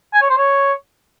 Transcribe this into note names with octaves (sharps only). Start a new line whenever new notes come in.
G#5
C#5
C5
C#5